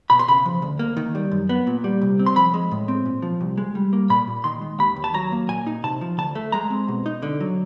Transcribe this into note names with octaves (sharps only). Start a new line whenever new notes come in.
B2 B5
C6
C#3 B5
F3
D2
A#3
D#3
G3
F#2
B3
A#2
G3
C2
C4
C6
F3 B5
G#3
A2
C4
A#2
F3
C2
G#3
G3
A#3
A#2 B5
A#2
D#3 C6
G#3
D#2 B5
D#2
A5
F#3 A#5
A#3
A#2 G#5
D#4
C3 A5
F3
D2 A5
A3
G#3 A#5
C4
B2
D#4
D3
F#3